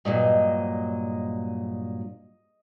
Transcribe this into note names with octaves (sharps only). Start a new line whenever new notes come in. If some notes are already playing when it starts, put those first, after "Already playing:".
G2 A#2 F#3 D#5